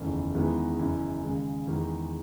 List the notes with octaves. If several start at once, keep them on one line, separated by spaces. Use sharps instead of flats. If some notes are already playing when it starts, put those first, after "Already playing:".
Already playing: F#1 E2 D#3 A3 C#4
E2 D#3 G#3 B3 E4
F#1 F#2 E3
D#2 C#3 G#3
E2 D#3 G#3